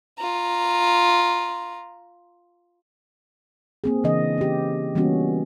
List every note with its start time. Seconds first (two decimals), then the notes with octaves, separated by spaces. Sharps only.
0.18 F4 A#5
3.84 A#3 C4 G#4
4.04 C#3 E3 C4 D4 D#5
4.38 C#4 G4
4.95 E3 G3 A#3 B3 C#4 F#4